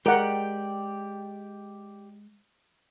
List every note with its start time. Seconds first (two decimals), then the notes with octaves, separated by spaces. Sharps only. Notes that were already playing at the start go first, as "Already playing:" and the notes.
0.06 G#3 G4 A#4 D5 F#5 G5